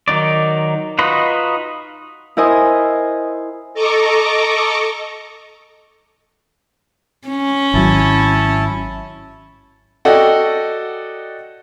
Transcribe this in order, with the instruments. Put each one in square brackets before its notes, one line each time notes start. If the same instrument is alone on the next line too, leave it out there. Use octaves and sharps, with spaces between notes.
[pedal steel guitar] D#3 F#3 D#4 D5
D#4 F4 F#4 B4 D#5
[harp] E4 A#4 C5 D#5 G#5 D#6
[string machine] A4 D#5 A#5 C#6 D6
[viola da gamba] C#4
[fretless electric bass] G#1 F#3 [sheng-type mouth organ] E4 A5
[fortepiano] F#4 A4 D5 D#5 F#5 G5